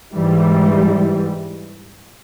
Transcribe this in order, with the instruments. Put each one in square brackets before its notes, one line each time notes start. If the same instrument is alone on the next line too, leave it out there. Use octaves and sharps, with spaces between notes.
[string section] G#2 E3 G3